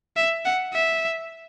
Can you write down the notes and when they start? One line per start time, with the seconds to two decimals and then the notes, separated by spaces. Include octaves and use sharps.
0.17 E5
0.45 F#5
0.73 E5